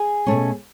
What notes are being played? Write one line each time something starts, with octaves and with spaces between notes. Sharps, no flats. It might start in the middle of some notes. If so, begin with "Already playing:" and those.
Already playing: G#4 G#5
B2 A3 C#4